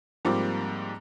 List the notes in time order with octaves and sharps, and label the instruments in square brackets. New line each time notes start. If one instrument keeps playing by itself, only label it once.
[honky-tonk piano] G#2 F3 G3 A#3 C4 D6